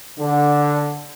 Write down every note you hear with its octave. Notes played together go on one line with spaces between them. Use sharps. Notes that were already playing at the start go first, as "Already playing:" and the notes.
D3